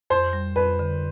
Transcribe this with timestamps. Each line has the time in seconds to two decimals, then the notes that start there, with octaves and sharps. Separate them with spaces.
0.10 F2 C5
0.33 G3
0.56 F2 B4
0.79 D3